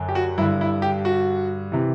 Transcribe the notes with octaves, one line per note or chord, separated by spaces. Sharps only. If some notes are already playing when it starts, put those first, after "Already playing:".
Already playing: F#2 D3
G4
F#4
G2 D3 E4
E4
G4
F#4
C3 E3